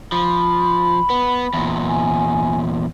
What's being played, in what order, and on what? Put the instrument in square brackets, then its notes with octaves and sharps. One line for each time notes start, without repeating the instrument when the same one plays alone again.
[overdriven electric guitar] F3 [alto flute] B5
[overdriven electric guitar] B3
E2 A#2
[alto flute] G#5